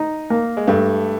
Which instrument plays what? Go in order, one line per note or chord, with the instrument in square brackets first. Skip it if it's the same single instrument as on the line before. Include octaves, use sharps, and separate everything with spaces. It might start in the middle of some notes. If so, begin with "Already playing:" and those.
Already playing: [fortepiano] D#4
A#3
[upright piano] G#3
[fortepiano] G2 [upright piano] A3